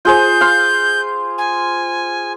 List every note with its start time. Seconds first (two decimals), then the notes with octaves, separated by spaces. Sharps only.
0.05 F4 G#4 C5 G6
0.41 F5 C6
1.38 G#5